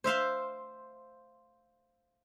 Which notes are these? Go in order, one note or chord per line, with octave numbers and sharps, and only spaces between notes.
C5 E5 F5 C6